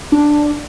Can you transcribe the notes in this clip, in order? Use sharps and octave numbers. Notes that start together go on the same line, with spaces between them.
D4